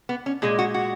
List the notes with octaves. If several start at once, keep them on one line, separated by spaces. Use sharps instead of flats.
B3
C#4
A#2 G#3 G#4
F#4
F#4